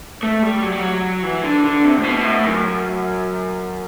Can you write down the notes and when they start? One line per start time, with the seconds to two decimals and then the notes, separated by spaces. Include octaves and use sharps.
0.23 A3
0.43 G3
0.62 F#3
0.72 G3
0.79 F#3
1.23 E3
1.43 D3
1.64 D3
1.84 C3
1.97 A2
2.04 B2
2.24 A2
2.45 F#2